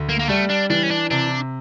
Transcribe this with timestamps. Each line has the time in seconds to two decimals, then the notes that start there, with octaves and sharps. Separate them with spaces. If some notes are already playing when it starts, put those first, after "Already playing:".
Already playing: D2
0.09 A#3
0.19 A#3
0.29 G3 A3
0.50 D4
0.70 E3 D4
0.83 C#4
0.91 D4
1.11 C3 D4